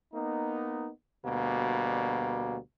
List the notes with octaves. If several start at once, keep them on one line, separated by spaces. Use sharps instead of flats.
A#3 B3 D#4
D2 B2 G3 A#3